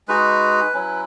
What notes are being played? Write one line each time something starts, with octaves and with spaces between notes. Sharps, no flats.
G#3 D#4 F#4 B4
F#3 C#4 E4